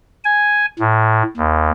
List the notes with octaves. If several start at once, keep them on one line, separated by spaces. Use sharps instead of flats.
G#5
A2
D#2